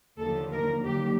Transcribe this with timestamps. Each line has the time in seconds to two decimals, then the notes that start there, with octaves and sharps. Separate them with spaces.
0.19 D#2 D3 F3 A4
0.52 A#4
0.84 D#2 D3 F#3 G4